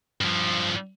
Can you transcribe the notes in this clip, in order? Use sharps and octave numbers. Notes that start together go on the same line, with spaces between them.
G2 F3